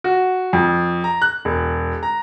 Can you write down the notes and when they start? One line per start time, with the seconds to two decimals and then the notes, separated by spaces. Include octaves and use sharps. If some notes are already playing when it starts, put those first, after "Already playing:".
0.04 F#4
0.53 F2
1.04 A#5
1.22 F#6
1.45 E1
2.03 A#5